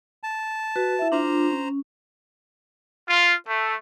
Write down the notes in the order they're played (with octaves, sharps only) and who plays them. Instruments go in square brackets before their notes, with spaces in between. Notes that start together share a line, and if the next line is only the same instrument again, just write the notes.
[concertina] A5
[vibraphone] F#4 B4
E4 E5
[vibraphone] D4 F4 [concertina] C5 A#5
[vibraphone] C#4
[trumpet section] F4
A3